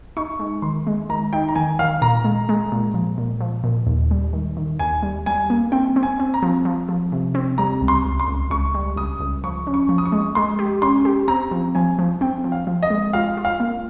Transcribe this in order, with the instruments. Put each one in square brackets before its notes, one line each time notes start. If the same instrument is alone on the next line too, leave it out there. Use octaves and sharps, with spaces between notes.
[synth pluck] D#4 [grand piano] C#6
[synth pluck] G#3
[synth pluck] D#3 [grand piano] C6
[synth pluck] G#3
[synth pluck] D#3 [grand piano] A#5
[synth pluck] D#4 [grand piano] G5
[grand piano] A#5
[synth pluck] D#3 [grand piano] G#5
[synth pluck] D#3 [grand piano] F5
[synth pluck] A#2 [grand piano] A#5
[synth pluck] G#3
G#3
A#2
F3
A#2
F3
A#2
D#2
G3
D#3
D#3
[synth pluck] D#2 [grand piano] G#5
[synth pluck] G3
[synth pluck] G3 [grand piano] G#5
[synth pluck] A#3
[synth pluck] C4 [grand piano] G5
[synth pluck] C4
[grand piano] G#5
[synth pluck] C4
[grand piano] A#5
[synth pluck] F3
F3
F3
C3
C4
[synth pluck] G3 [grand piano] A#5
[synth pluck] C#2
[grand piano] C6
[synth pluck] C#2
[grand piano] C6
[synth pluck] C#2
[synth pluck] C#2 [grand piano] C#6
[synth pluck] G3
[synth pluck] C#2 [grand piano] D#6
[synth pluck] C#2
[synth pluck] F3 [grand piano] C#6
[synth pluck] C#4
[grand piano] C#6
[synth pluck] F3
[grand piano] D#6
C#6
[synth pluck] G#3
[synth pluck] G#3 [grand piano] C6
[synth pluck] G4
[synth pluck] C#4 [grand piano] C6
[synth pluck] G4
[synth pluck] C4 [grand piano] A#5
[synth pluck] F3
[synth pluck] F3 [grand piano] G#5
[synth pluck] F3
[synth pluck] C4 [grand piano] G5
[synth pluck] F3
[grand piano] F5
[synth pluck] F3
[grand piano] D#5
[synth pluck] G#3
[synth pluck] F4 [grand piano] F5
[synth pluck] F4
[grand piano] F5
[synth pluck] A#3